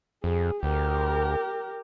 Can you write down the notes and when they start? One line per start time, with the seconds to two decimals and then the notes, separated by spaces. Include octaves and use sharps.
0.24 F2 G#4
0.63 D2 G4 A#4